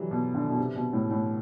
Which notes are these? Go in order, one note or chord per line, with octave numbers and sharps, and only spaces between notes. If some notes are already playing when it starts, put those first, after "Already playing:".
Already playing: C3 E3 F#3 G3
B2
D3
B2
C3
B2
A2
A2